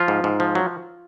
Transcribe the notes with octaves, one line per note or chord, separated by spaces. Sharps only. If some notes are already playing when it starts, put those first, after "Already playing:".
Already playing: F3 F4
G#2
G#2
F3
F#3